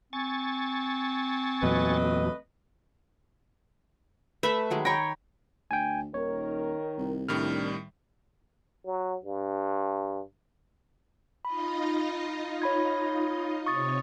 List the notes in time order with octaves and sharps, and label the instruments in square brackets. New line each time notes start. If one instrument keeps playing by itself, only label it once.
[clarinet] C4 [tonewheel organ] G#5 C#6 A6
[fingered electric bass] E2 A#2 F#3 [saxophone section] A3 B4 D#5
[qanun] A3 E5 B5 [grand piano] B4
[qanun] D#3 F#3 G#3
[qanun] C#5 G5 [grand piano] A#5 B5 A#6
[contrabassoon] D2 [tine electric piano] G5 G#5
[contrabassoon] D#1 [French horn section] D#3 A#4 [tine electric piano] C#5
[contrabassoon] C2
[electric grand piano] A2 D#3 G3 [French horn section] D4 [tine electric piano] F6
[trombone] F#3
G2
[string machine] D#4 F4 D#5 [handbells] B5
[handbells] C#5 B5 G#6
[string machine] C3 C#5 [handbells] C#6 D#6 A6